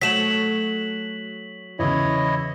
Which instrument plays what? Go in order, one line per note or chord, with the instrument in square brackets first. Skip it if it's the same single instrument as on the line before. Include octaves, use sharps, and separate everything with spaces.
[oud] F#3 A3 [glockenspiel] B6 E7 F#7
[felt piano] E2 C#3 [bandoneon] E4 C#5 D#5